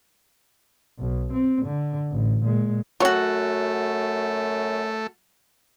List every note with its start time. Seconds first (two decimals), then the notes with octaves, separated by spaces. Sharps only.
0.99 B1
1.33 C4
1.66 D3
2.11 A1
2.44 A#2 G#3
3.00 F#2 F#3 A3 F4 F#4 C#5